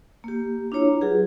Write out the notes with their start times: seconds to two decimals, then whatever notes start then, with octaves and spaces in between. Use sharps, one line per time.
0.24 A#3 G4
0.72 D4 E4 F4 C#5 A#5
1.01 F#3 F4 G4 G#4 B4